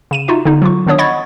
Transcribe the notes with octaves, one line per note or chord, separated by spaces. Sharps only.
C#3 D#7 E7
D#4 F4 F#4 E5
D3 B3 D#4
F#3 F4 C#6
D#3 B3 D4 C#5 D#6
D#5 F#5 B5 C#6 G#6 A6